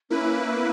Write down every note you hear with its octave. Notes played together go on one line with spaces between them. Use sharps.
A#3 C#4 E4 B4
B3